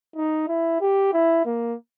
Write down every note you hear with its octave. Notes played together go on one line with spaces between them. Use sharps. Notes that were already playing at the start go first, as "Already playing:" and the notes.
D#4
E4
G4
E4
A#3